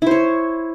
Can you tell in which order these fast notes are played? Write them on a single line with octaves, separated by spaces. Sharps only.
E4 C5 C#5